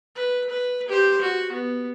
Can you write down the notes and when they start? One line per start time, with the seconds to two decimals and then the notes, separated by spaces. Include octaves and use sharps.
0.15 B4
0.49 B4
0.88 G4 C5
1.21 F#4
1.52 B3